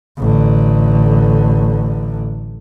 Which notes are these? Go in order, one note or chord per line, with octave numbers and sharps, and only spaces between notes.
A1 D3